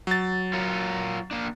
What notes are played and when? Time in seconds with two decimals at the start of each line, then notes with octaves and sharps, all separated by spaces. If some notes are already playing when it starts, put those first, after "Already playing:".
0.07 F#3 A6
0.53 F4 A#4 C#5
1.31 A#3 D4